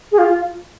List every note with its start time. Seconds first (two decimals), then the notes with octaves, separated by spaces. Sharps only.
0.11 G#4
0.18 F4
0.28 F4